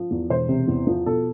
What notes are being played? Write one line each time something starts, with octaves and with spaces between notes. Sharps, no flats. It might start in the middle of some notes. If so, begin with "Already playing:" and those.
Already playing: F3
E2
E1 C5
C3
E2
F3
B2 A4